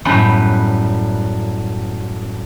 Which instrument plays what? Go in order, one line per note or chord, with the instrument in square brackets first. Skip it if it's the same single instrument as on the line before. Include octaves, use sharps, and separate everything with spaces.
[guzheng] F#2 A2 G3 B3